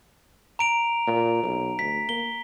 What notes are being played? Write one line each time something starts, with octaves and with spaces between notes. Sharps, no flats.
A#5 D7 F7
A#2
B1
D2 B6
A#3 G7